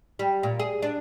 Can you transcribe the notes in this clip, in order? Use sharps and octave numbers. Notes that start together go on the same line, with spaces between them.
G3
A#2
G#4
D4